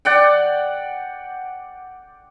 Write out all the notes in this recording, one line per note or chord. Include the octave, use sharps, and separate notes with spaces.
D5 F#5 G5